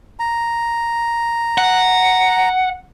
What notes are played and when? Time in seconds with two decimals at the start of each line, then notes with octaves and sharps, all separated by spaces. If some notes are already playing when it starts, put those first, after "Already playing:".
0.19 A#5
1.58 F#5